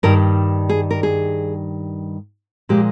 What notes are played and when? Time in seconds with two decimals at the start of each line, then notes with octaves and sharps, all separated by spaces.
0.03 G2 D#3 G3 A#4
0.69 G#4
0.91 A#4
1.03 G#4
2.69 A#2 F3 G#3 G4